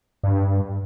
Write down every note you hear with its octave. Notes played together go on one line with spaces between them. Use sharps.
G2